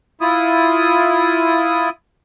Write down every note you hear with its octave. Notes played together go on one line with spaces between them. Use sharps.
E4 F4 D#6